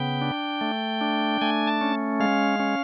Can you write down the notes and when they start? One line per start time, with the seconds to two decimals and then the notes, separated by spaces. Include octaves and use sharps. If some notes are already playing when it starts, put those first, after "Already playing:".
Already playing: C#3 B3 G5
0.22 D4
0.61 A3
1.01 D4
1.41 A3 G#5
1.67 A5
1.81 C#4
2.20 G#3 F5
2.60 C#4